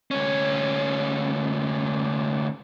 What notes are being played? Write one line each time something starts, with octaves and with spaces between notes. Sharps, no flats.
D2 C#4